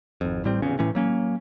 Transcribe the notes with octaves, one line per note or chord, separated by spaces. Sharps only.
G#1 F2
A1 A2 G3 C4
F1 E2 C#3 C#4
A2 E3 A3 C#4
F#3 A#3 C#4